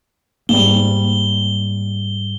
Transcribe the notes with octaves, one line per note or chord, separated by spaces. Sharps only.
G#2 G3 A#3 G7